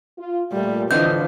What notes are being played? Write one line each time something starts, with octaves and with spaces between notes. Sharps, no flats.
F4
A#2 G3 A3
A2 D3 E3 F3 D#5 G6